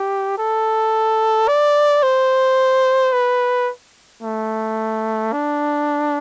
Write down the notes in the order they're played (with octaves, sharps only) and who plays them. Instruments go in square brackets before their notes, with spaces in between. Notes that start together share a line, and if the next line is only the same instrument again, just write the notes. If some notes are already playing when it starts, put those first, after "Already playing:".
Already playing: [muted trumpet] G4
A4
D5
C5
B4
A3
D4